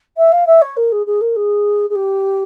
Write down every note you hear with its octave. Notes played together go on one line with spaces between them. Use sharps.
E5
F5
E5
C#5
A#4
G#4
G#4
A#4
G#4
G#4
G4